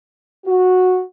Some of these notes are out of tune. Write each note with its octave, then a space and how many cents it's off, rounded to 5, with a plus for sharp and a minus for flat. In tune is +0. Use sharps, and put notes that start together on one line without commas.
F#4 -10